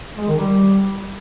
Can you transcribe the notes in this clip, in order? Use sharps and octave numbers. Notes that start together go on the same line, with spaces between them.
G#3
D#3
G3